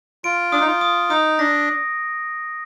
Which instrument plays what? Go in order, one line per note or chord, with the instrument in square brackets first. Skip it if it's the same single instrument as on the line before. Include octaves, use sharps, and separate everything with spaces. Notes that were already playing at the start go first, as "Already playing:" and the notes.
[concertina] F4 [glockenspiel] D7
[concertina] D4 [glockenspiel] D#6
[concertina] D#4
F4
[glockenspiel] D#6
[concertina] D#4 [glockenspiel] D#6
[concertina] D4 [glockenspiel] A#6